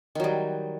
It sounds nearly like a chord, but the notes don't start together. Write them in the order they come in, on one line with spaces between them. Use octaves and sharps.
D#3 F#3 G3